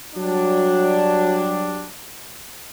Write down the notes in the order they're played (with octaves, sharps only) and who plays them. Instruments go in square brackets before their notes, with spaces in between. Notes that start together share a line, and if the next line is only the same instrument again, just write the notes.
[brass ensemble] F#3 G3 D4